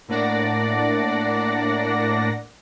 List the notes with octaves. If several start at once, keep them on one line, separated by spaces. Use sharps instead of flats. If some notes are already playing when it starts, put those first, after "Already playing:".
A2 A#3 D4 D5 F#5 A#6